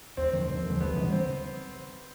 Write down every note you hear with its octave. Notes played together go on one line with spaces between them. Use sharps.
D#2 C4
D3 F3
D#2
D3 F3
D2 B3
C#3 E3 G3
C4